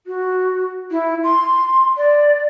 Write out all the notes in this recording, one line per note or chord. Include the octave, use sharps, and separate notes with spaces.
F#4
E4
C6
D5